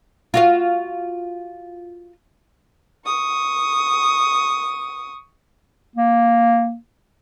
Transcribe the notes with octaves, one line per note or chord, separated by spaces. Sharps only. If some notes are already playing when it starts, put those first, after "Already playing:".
F4 F#4 F5
C#6 D#6
A#3